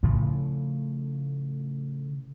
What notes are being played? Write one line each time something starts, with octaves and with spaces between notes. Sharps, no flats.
A2 C#3 F3 A3